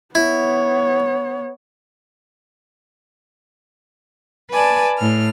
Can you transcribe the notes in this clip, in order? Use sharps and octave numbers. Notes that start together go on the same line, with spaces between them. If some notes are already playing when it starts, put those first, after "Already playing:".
B3 E4 C#5
B4 D5 G#5 A5
A2 F6